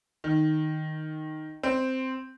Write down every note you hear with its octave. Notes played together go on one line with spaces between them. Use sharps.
D#3
C4